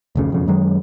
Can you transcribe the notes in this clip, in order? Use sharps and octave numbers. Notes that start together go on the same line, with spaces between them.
F1 D2 C#3
E1 F2 C#3
F#2 D#3 F#3 G#3